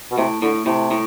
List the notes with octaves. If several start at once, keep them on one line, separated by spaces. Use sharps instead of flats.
B2
A2 C3
A2 D3
A2 C3
A2